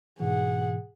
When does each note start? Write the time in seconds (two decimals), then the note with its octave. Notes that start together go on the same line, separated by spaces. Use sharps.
0.20 G#2 B2 E3 G#4 F#5